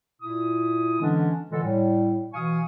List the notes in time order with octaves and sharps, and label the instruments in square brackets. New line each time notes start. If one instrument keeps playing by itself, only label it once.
[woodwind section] A#2 E4 D#6
D3 E3 G#3 B3 C#4 D4
A#2 D3 E3 G#3 A4
A2 G3
B2 E3 F5 G#5 C#6 D#6